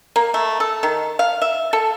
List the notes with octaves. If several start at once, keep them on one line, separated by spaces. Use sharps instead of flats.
A#3
A3
A4
D#3
F5
E5
A4